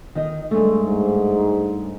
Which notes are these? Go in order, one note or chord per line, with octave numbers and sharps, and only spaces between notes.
D#3 D#5
G2 G#3 A3
G#2